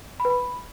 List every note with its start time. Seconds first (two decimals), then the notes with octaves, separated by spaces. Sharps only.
0.20 B5
0.25 B4
0.30 B5